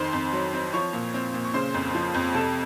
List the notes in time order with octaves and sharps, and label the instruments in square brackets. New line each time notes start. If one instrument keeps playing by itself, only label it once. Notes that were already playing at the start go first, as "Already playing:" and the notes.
Already playing: [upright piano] F2 D#3 C5 C6
F2
F#3
C4
F3 C#5 C#6
A#2
C4
A#2
C#6
C#3 C5 C6
F2
F3
F2
C3 A4 A5